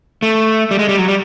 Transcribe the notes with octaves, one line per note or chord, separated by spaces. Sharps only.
A3
G3
G#3
G3
F#3
G3